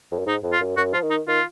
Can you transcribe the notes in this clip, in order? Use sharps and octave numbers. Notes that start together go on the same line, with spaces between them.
F2
F#2
G#2 D#4
F2
F4
F#2
F#2 F#4
F3 F4
D#3
D#4
D#3 F4